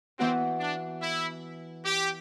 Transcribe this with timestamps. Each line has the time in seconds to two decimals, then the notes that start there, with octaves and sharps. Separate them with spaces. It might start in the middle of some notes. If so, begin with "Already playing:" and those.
0.18 E3 B3 C4 F#4
0.60 D4
1.01 E4
1.84 G4